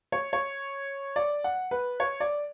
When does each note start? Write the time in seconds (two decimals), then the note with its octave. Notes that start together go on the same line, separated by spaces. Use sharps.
0.12 C#5
0.33 C#5
1.16 D5
1.44 F#5
1.71 B4
2.00 C#5
2.20 D5